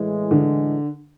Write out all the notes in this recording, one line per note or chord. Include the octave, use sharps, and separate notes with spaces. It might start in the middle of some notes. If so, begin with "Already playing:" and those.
Already playing: A2 E3 G#3
D3